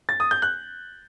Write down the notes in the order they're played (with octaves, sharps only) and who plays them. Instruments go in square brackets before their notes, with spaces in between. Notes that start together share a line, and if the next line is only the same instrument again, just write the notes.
[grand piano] A6
D#6
G6
F#6